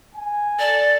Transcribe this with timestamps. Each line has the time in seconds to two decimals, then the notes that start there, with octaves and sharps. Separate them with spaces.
0.14 G#5
0.59 A4 D5